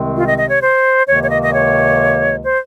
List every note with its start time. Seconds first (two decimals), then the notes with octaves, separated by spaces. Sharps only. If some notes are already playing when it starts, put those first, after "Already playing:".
Already playing: C2 C3 D#3 G#3 C4
0.16 F4
0.27 D#5
0.38 D#5
0.50 C#5
0.62 C5
1.07 C#2 C3 D#3 A#3 C#5
1.23 C#5
1.30 D#5
1.42 D#5
1.53 C#5
2.45 C5